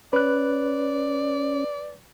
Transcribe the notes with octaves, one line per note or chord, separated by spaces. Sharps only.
C#4 B4 D5 F#6